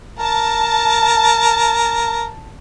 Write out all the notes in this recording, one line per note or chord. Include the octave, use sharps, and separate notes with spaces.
A#4 A5